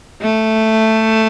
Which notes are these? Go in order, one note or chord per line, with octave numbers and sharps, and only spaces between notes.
A3